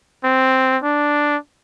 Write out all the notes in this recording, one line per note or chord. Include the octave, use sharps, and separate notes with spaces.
C4
D4